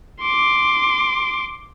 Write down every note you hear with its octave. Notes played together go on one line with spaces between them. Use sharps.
C6 D6